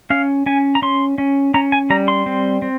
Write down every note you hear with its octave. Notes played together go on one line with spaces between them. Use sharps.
C#4 F5
C#4 G#5
A#5
C#4 C6
C#4
C#4 A#5
G#5
G3 A#5
C6
C4
C4